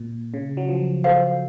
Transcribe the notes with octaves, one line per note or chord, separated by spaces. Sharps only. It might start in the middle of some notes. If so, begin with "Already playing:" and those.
Already playing: A#2
C#3
F#3
F3
A4 C5 F5